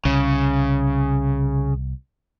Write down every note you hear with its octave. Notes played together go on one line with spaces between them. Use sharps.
C2 C#3